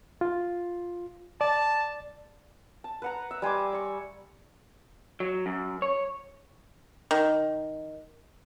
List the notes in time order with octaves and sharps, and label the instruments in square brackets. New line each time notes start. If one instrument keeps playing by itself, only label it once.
[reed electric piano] F4
[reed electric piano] D5 [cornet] A5
[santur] A5
B4 F#5 A#5
E5
G3 G#5 C6 D6
D5 C#6
[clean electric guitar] F#3
F#2
C#5
[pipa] D#3